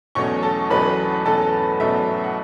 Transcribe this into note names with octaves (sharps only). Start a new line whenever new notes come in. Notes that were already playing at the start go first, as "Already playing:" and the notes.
E2 B2 F#3 A3 C#4 C#5 C#6
A4 A5
E2 B2 F#3 A3 C#4 B4 B5
E2 B2 F#3 A3 C#4 A4 A5
E2 B2 F#3 A3 C#4 E5
F#5